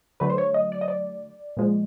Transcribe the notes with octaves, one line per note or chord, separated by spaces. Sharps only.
D3 F#3 A3 B4
C5
C#5
D#5
D5
D#5
D5
A#2 F3 G#3